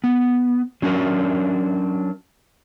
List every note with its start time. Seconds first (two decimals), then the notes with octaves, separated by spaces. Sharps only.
0.04 B3
0.82 F#3 C#4 D4 F#4 A#4